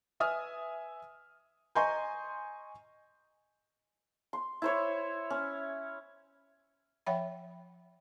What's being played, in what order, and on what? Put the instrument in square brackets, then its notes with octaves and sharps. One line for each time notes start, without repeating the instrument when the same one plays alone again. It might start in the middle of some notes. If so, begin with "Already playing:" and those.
[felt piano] B4 E5 G#5 D#6 F6
D#5 G#5 A#5 C6 C#6 G6
[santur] C6
E4 C5 C#5
C#4
[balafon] F3 C#5 E5 F#5 G5 B5